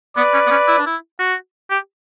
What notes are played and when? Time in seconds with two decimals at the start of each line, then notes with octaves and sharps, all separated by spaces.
0.16 B3 B4 D5
0.34 C#4
0.47 B3
0.51 C#4
0.68 E4
0.77 D4
0.86 E4
1.19 F#4
1.70 G4